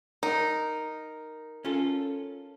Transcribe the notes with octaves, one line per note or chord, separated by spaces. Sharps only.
D#4 A#4
C#4 F4 A4